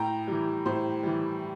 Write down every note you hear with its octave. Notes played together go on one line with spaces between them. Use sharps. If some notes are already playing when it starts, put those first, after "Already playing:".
Already playing: A2 G5 A#5
E3 G3
A2 C5
E3 G3